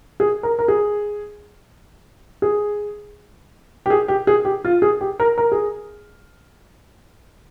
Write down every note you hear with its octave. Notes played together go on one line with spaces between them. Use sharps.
G#4
A#4
A#4
G#4
G#4
G4
G#4
G4
G#4
G4
F4
G#4
G4
A#4
A#4
G#4